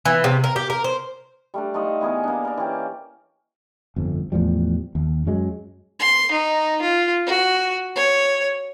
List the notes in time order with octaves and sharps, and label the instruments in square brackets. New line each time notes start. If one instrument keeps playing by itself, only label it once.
[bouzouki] E3
C3
A#4
G4
A#4
C5
[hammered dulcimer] G3 A3 D4
A3 D#4 F4 D#5
E3 B3 G#4 A#4
A#3 D4
A#4 D5
E3 C#4 G4
[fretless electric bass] G1 F2
E2 A2 F3 G3
D#2
F#2 F#3 G#3
[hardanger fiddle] C6
D#4
F4
F#4
C#5